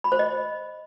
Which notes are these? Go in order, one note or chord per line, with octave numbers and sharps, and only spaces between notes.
B5
C5
D#5